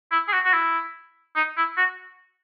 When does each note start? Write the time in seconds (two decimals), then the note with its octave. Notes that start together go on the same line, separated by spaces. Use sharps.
0.12 E4
0.28 G#4
0.33 F#4
0.45 F#4
0.53 E4
1.36 D#4
1.57 E4
1.77 F#4